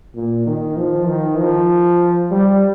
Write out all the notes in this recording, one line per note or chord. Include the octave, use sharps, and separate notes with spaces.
A#2
D#3
F3
D#3
F3
G3